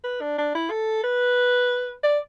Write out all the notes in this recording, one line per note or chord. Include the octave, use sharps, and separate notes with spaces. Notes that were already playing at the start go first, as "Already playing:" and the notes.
B4
D4
D4
E4
A4
B4
D5